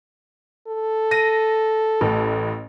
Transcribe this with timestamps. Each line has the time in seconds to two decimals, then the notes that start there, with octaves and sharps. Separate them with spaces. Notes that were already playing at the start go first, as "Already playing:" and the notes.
0.67 A4
1.11 A#6 D#7
2.01 A1 A2